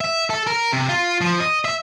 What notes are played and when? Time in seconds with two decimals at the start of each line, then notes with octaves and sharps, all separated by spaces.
0.01 E5
0.30 A4
0.47 A#4
0.72 C3
0.89 F4
1.21 F3
1.40 D#5
1.65 E5